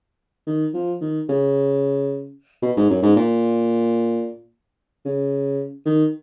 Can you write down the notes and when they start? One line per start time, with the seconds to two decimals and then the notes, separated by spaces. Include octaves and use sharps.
0.47 D#3
0.74 F3
1.01 D#3
1.29 C#3
2.62 B2
2.77 G#2
2.90 F#2
3.02 G#2
3.16 A#2
5.05 C#3
5.85 D#3